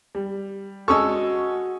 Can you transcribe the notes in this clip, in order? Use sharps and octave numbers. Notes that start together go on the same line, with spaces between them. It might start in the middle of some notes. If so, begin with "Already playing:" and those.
G3
G#3 C#4 F#4 A4 C#6 D#6 E6